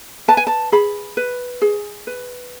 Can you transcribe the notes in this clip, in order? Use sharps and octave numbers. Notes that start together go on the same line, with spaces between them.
B4 A5
G#5
A5
G#4 B5
B4
G#4
B4